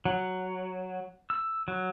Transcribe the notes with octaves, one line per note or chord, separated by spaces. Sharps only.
F#3
E6
F#3